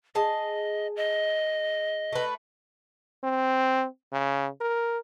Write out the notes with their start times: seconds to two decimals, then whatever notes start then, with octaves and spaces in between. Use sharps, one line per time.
0.15 G#4 D#5 A5
0.96 D#5
2.13 A3 B4
3.24 C4
4.12 C#3
4.61 A#4